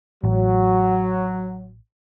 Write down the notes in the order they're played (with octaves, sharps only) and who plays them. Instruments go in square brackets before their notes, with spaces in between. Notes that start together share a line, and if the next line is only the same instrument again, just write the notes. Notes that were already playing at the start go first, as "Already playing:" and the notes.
[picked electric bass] A1 [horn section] F#3